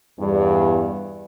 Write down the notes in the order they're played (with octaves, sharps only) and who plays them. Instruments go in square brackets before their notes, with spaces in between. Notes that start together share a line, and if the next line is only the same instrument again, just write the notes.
[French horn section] E2 G2